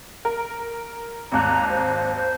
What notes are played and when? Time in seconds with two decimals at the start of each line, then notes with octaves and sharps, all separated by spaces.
0.25 A#4
1.32 G#1 D#2 A#5 F#6
1.69 C5
2.15 C5